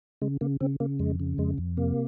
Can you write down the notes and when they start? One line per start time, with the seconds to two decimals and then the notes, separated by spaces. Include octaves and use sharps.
0.22 C#3 G#3
0.41 C#3 A#3
0.61 C#3 C4
0.80 C#3 A#3
0.99 F2 G#3
1.20 C#3
1.38 F2 G#3
1.58 F2
1.77 C3 A#3